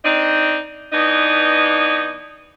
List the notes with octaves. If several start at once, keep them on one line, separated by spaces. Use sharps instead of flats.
C4 D4 D#4
E3 B3 D4 D#4